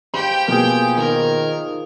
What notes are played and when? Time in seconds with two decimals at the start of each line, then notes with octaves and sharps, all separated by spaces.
0.14 G4 C5 F5 G5 B5
0.47 B2 F3 A#3 G#4
0.98 D#3 A#4